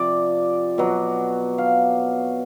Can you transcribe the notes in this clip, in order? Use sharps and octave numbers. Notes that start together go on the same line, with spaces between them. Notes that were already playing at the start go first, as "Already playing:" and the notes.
Already playing: C3 F3 D5
B2 F#3
F5